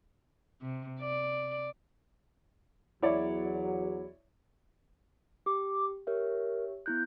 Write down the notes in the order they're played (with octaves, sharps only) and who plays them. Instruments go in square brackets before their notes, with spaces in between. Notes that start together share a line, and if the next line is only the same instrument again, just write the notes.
[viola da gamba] C3
D5
[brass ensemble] E2 F#3 [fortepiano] E4 C#5 D5
[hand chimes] G4 [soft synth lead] D6
[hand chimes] G4 C#5 E5 [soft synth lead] A#4
[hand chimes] B3 E4 F#6 [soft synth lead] G6